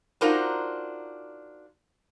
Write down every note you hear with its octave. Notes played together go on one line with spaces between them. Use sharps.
D4 D#4 F4 F#4 A#4 C5